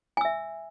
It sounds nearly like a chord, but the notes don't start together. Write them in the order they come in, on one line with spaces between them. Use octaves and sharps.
G#5 E6 E5